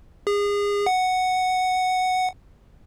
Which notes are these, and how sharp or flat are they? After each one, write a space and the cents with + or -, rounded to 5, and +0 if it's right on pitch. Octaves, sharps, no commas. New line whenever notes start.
G#4 -30
F#5 +0